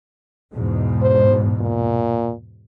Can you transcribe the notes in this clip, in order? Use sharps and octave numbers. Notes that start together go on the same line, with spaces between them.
E2 G#2 B2
C5
A#2